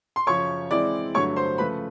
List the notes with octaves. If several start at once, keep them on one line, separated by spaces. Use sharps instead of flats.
C6
F#2 C#3 F3 C#5 C#6
E3 G#3 C4 E4 D5 D6
G2 D3 F#3 A3 C#5 C#6
C5 C6
C#3 F3 A3 B4 B5